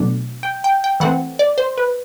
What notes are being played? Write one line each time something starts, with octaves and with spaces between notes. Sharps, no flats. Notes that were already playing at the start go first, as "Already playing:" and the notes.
Already playing: B2 F#3 A3 D4
G5
G5
G5
E3 A3 C4 F#5
D5
C5
B4